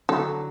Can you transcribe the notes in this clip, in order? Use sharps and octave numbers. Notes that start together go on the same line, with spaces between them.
D3 F#3 A4